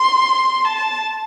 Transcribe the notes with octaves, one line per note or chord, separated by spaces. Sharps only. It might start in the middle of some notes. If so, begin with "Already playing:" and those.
Already playing: C6
A5